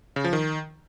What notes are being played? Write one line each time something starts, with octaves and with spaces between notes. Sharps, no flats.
C#3
F3
D#3